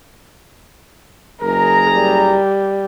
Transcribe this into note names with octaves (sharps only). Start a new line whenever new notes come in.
F#1 G#4 A#4 A#5
G3